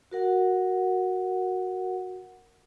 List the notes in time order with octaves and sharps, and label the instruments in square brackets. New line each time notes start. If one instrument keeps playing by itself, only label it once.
[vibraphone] F#4 A#4 F#5